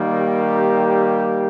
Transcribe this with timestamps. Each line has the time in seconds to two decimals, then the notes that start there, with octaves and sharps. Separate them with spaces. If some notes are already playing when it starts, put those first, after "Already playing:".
Already playing: D#3 G3 A#3
0.17 G4